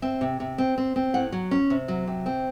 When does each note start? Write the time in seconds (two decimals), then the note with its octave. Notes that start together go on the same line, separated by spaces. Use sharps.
0.02 C4 E5
0.21 C3
0.40 C3
0.58 C4
0.78 C4
0.96 C4
1.14 A2 F#5
1.32 F#3
1.51 C#4
1.70 C3
1.88 F#3
2.07 C3
2.26 C4